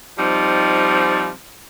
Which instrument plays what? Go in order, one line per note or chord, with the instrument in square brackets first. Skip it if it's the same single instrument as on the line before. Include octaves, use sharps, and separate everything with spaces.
[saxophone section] F3 G3 C4 D#4